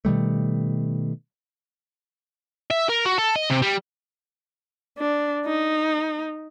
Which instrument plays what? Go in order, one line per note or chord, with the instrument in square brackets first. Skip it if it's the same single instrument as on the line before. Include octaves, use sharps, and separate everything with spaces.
[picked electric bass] B2 D#3 G3 A3
[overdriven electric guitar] E5
A#4
F#4
A4
D#5
C3
G3
[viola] D4
D#4